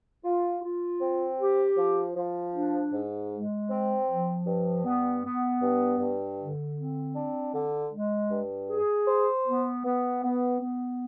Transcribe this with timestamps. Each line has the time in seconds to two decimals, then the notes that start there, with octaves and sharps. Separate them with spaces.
0.24 F4
0.63 F4
1.01 C4
1.39 G4
1.77 F3
2.16 F3
2.54 D4
2.92 G#2
3.32 G#3
3.70 C4
4.07 F3
4.46 G2
4.84 B3
5.24 B3
5.62 G2
5.99 G2
6.39 D3
6.77 C4
7.16 D4
7.53 D3
7.92 G#3
8.30 G2
8.69 G#4
9.07 C5
9.46 B3
9.83 B3
10.23 B3
10.60 B3